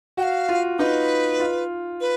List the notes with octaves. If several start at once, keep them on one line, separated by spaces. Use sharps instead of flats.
F#4 G5
F5
F4
D#4 B4
F4
B4